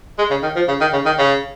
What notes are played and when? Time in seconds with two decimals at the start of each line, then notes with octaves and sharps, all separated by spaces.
0.18 G#3
0.30 C#3
0.43 D#3
0.56 F3
0.68 C#3
0.81 D#3
0.93 C#3
1.06 D#3
1.18 C#3